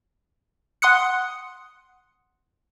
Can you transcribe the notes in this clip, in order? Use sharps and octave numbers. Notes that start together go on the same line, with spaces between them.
F#5 C6 D#6 F#6 C#7